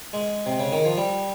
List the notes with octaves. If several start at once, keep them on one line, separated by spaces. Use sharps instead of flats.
G#3
C3
C#3
D#3
F3
G3